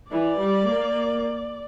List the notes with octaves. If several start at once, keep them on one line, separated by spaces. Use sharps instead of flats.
E3 D5
G3
A#3